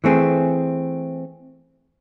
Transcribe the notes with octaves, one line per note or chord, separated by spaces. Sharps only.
E3 A3 C4 G#4